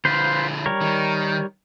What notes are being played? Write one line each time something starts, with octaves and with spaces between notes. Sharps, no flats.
D3 F3 F4 B4 C5
G3 A#4 C#5
D#3